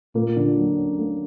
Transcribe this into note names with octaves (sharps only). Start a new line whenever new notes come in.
A#2 A#3
D3
F#3
C#4
A#3